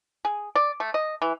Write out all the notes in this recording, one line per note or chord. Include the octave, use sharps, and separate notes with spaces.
G#4
D5
A3
D#5
E3